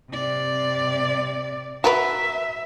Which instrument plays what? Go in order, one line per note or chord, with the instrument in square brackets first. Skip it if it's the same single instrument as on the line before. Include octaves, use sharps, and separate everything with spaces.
[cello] C3 D5
[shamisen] F#4 A#4 B4 [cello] E5